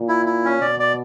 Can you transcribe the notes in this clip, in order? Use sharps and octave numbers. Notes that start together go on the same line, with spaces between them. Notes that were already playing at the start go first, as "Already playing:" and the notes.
Already playing: A#2
E4
E4
C#4
B2 D5
D5